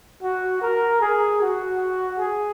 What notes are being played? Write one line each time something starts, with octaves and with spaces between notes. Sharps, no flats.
F#4
A#4
G#4
F#4
G#4